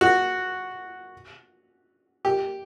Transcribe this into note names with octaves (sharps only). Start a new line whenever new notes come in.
F#4
G4